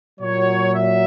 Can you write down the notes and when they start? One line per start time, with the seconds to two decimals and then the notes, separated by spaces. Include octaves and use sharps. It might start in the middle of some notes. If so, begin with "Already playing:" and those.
0.20 A#2 F#3 C#5
0.75 E5